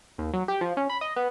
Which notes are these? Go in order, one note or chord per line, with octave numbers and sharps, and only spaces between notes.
D#2
F#3
G4
F3
C#4
B5
D#5
B3